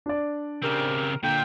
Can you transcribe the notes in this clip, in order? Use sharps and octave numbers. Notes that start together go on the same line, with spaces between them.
D4 D5
C#3 C4 G4 A#4
A#2 D3 G5